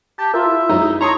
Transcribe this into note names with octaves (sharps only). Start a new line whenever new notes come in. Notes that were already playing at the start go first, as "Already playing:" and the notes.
G4 A5
F4 A#4 E5
E4
F#2 F#3 G#3 D#4
C#5 A5 A#5 C6 D#6